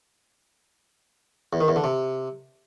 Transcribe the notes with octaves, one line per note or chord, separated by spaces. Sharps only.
E2
D#3
E2
D3
C3